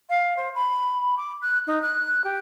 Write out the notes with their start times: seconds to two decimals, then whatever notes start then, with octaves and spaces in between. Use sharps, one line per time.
0.09 F5
0.36 C5
0.55 B5
1.17 D6
1.41 F#6
1.67 D#4
1.82 F#6
2.24 G4